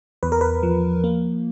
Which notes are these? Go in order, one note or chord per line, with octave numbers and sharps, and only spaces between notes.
E2 B4
A#4
B4
F3
A#3